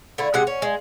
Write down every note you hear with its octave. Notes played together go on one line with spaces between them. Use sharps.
D3 A3 E4
C3 G#3 F#5
C#4
G#3